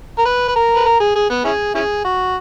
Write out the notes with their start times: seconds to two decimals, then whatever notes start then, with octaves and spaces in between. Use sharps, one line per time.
0.18 A#4
0.25 B4
0.48 B4
0.56 A#4
0.75 B4
0.85 A#4
1.00 G#4
1.15 G#4
1.30 B3
1.44 C#4 E4 G#4
1.74 C#4 E4 G#4
2.05 F#4